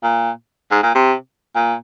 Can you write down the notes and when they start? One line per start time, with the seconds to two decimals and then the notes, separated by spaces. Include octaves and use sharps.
0.03 A#2
0.71 G#2
0.83 A#2
0.95 C3
1.56 A#2